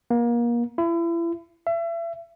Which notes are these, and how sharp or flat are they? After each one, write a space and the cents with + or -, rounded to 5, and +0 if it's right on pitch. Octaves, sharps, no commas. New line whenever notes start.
A#3 +30
E4 +35
E5 +35